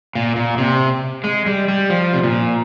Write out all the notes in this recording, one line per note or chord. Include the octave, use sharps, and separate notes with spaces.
A#2
A#2
C3
G#3
G3
G3
F3
C3
A#2